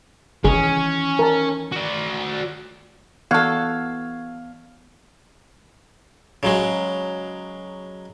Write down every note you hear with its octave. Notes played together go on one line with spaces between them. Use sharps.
D#3 E3 C#4 G#4
A#4 A5
F#4 D5
E3 B3 F#4 A4 F5 C#6 G#6 C7
C#3 F#3 G#3